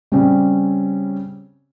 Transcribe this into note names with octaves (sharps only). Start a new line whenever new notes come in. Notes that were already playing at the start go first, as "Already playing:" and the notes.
C#3 G3 C4 C#4